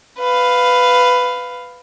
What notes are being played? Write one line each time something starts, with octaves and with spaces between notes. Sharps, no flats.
B4 F5